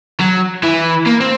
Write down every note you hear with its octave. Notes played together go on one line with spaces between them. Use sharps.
F#3
E3
A#3
C4